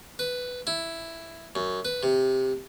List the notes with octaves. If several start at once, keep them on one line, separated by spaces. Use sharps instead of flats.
B4
E4
F#2
B4
C3